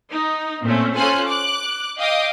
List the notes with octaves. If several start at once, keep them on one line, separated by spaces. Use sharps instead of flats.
D#4
A#2 A3 C4 C#4
C#4 F4 A4 C5 G#5 F#6
D6 F#6
D#5 F5 G5 D6 D#6